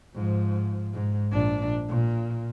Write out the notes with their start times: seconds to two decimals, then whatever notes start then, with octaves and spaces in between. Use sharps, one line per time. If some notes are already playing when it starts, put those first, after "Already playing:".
0.15 G#2 F3
0.93 G#2
1.32 A#1 D4
1.89 A#2